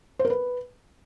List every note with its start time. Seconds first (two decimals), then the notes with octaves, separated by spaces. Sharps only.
0.19 C5
0.25 A#4
0.30 B4